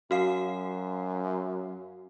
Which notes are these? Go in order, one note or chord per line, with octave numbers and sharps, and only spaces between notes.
F#2 F#4 F5 C7